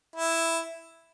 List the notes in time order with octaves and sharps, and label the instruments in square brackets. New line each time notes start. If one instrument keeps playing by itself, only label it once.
[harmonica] E4